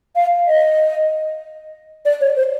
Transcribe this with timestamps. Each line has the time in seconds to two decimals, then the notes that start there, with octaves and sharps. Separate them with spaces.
0.16 F5
0.47 D#5
2.05 D5
2.21 C#5
2.37 C5